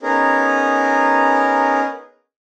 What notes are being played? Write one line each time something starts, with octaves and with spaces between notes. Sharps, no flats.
B3 C#4 D#4 G#4 A#4